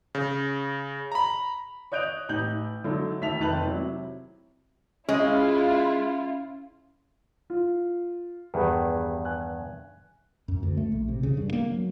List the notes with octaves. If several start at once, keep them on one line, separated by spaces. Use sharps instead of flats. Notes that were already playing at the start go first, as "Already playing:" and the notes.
C#3
A#5 B5
C#5 D#5 F#6 G6 D7 F7
A1 D#4 G6 F#7
D3 F#3 D#4 E4 A4
D2 D#3 E5 A5 B6 F7
F1 D#3 B4 A5 B5 F#7
C3 F#3 E4
G#3 C#4 E4 F4
F4
E2 G2 D#3 G4 G#4 B4
G#5 F#6
F#2
D2
A3
A#1
C3
C#3
G2
A#3
F#3